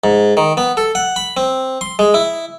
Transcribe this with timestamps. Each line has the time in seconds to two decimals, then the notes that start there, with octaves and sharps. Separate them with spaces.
0.04 G#2
0.37 D#3
0.57 B3
0.77 A4
0.95 F#5
1.16 B5
1.37 C4
1.81 C6
1.99 G#3
2.14 E4